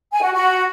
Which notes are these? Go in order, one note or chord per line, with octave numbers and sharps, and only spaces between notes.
G#5
F#4
F#4